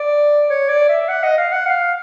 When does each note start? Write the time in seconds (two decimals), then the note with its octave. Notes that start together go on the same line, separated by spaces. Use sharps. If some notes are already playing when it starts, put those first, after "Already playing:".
Already playing: D5
0.50 C#5
0.69 D5
0.89 E5
1.08 F#5
1.23 D#5
1.37 F5
1.52 F#5
1.66 F5